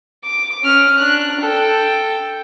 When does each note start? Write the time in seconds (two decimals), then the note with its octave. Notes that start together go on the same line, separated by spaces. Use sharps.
0.24 D6
0.63 C#4 F6
0.98 D4 F#6
1.40 A4 G5